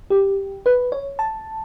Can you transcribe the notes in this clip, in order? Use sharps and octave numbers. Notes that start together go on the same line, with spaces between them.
G4
B4
C#5
A5